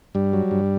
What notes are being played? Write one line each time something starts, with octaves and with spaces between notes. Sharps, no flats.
G2 G3
F#3
G2